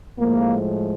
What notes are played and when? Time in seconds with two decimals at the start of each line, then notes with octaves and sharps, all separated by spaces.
0.19 A2 F3 G#3 A#3